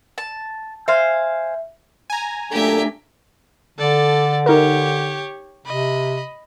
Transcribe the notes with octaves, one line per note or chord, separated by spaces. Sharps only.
A5
C5 E5 F5 G#5
G#5 A#5
F#2 A#2 A3 D4 G4 A4 E5
D3 A4 D5
D#4 G4 A#4 C#5
C3 D#5 B5